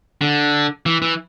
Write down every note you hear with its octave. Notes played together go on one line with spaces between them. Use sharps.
D3
E3
E3